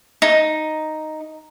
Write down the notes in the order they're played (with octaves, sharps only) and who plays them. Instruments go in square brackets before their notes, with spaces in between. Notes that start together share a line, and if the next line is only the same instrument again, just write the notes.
[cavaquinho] D#4